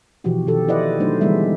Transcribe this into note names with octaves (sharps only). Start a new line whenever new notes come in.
B2 E3 F3 F#4 G4
B2 D#3 G4 A4
E4 B4 C5 D5 D#5 F#5
F#3 A3 D4 D#4 C5
D3 E3 G3 G#3 B3 E5